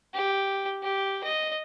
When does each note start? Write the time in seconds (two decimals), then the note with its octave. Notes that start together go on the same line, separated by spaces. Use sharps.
0.14 G4
0.83 G4
1.24 D#5